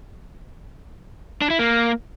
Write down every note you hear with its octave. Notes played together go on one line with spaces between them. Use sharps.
D4
E4
A#3